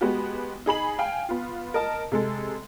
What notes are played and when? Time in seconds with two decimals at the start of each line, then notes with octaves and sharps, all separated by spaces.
0.01 G#3 B3 F#4 G4
0.66 D#4 G#4 B5 F#7
0.98 F5 G5 G#5
1.29 B3 F4
1.74 A#4 D#5 A5
2.12 C3 G#3 A4